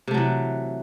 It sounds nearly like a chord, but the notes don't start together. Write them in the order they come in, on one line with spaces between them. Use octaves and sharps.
C3 A3 F#3 E3